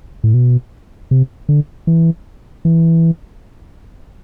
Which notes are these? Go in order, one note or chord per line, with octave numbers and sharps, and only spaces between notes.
A2
B2
C3
D3
E3
E3